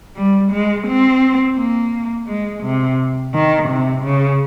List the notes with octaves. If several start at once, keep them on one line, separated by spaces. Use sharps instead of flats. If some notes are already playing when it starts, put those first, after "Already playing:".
G3
G#3
C4
A#3
G#3
C3
D#3
C3
C#3